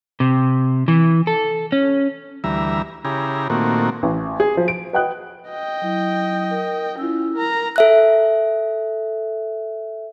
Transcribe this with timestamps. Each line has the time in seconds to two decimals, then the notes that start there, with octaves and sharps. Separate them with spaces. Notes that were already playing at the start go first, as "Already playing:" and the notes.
0.20 C3
0.88 E3
1.27 A4
1.72 C#4
2.44 D2 E3 G3 E5 A#5
3.05 C#3 E4 G4 G#4 A#5
3.50 A#2 D#3 A3 A#3 C4 F#4
4.03 A1
4.40 G#4
4.55 F3 F#3
4.68 D7
4.93 B4 D#5 F#5 G5 D#6 F#6
5.48 D#5 G5
5.82 F#3 E4
6.51 A#4
6.98 C#4 E4 F4 E6
7.34 A#4 A#5
7.76 A4 E5 F#6